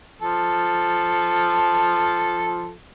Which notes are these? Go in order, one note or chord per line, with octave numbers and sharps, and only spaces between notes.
F3 A4